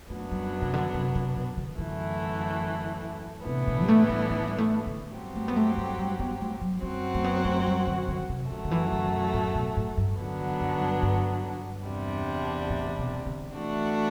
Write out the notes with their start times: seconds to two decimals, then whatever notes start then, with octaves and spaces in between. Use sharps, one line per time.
0.10 F#2 F#3 A3 B3 D4
0.31 G3
0.62 C3
0.74 D3
0.94 C3
1.15 C3
1.36 B2
1.57 D3
1.78 F#2 D3 E3 A3
3.46 A2 C3 E3 B3 D4
3.67 B2
3.82 G3
3.88 A3
4.09 G3
4.30 A3
4.48 G3
4.58 A3
4.87 D3
5.14 G2 F#3 C4 G4
5.35 A3
5.48 B3
5.56 A3
5.78 A3
5.98 G3
6.20 B3
6.40 A3
6.62 F#3
6.82 F#2 F#3 G3 C4 F#4
7.15 A3
7.24 B3
7.45 A3
7.66 G3
7.87 D3
8.08 D3
8.29 C3
8.51 F#2 D3 F#3 A3
8.65 D3
8.71 E3
8.93 D3
9.14 B2
9.34 A2
9.55 B2
9.77 A2
9.97 G2
10.18 F#2 D3 F#3 B3 D4
10.39 E3
10.61 F#2
10.81 G2
11.03 G2
11.86 E2 C3 G3 D4
12.70 A2
12.99 B2
13.27 D3
13.54 E3 A3 D4 F#4